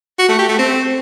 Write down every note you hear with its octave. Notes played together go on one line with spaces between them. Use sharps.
F#4
A3
G4
A3
C4